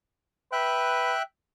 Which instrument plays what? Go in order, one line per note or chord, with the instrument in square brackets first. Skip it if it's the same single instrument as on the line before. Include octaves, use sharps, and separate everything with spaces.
[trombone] B4 [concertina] E5 G5 F#6